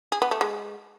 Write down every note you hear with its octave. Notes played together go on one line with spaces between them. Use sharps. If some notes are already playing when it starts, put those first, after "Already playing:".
G#4
B3
A3
G#3